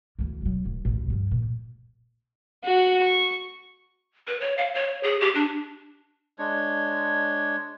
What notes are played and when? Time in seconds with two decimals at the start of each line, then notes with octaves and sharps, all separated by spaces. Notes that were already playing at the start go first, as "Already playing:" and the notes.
0.19 D2 E3
0.42 E1 F#3
0.65 D1
0.85 A1 D2
1.10 G2 F3
1.31 A#2
2.64 F#4 F#5
3.03 C#6
4.27 B4
4.41 C#5
4.58 F5
4.75 C#5
5.03 G#4
5.21 G4
5.35 D4
6.39 G#3 D4 C#5